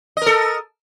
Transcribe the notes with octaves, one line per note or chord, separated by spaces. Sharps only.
A4 A#4 D#5